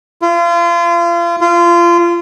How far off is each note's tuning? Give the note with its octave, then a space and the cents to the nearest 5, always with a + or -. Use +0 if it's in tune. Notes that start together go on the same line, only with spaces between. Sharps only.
F4 -35
F4 -25